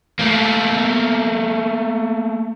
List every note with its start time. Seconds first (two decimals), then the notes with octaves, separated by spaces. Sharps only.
0.19 A3 A#3